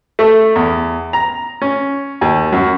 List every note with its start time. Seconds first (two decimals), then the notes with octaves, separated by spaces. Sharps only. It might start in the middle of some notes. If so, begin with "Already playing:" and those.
0.19 A3
0.56 E2
1.13 A#5
1.62 C#4
2.21 D#2
2.52 F#2